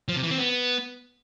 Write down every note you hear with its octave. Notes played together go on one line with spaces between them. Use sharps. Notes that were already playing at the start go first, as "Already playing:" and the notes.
F3
C3
E3
C4
B3